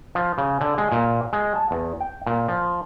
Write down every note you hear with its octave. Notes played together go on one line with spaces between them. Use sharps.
F3
C#3
D3
G#3
A#2
G#3
A5
E2
G5
A#2
F3